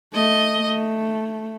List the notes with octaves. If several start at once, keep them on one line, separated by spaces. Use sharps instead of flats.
A3 D#5
A3